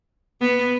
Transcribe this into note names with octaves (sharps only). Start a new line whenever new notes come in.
B3